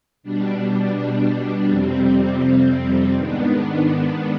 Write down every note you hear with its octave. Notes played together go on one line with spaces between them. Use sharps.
B2 G3 D4
F2 C3 G3 C4
G#2 D#3 B3 D4